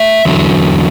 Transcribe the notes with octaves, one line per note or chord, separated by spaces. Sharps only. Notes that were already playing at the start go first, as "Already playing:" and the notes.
Already playing: A3 E5
E2 D3 F#3